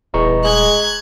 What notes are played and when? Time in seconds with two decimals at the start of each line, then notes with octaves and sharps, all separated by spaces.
0.14 D#1 E2 D#5 A#5 C#6
0.44 G#3 F#6 G#6